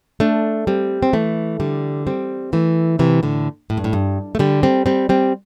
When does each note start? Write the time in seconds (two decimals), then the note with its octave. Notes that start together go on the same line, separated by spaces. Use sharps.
0.20 A3 D4
0.67 G3 C4
1.03 C4
1.13 E3 A3
1.60 D3 G3
2.07 G3 C4
2.53 E3 A3
2.99 C3 E3
3.23 A2 D3
3.70 A2
3.77 G2
3.84 A2
3.93 G2
4.35 A3
4.39 D3 G3
4.63 G3 C4
4.86 G3 C4
5.09 G3 C4